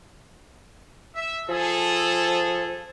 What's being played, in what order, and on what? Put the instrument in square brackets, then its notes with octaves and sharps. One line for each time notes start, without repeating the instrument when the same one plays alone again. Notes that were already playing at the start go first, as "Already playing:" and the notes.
[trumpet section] E5
[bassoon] F3 [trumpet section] G#4 A4